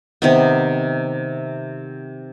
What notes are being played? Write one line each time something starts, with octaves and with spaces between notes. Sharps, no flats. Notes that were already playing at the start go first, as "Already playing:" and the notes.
C3 D#3 B3